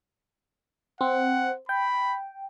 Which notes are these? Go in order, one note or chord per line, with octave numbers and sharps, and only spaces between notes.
C4 F#5
G5 B5